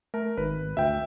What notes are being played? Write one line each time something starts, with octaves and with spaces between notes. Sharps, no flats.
A3 A#4
G#1 B4
D2 E5 G5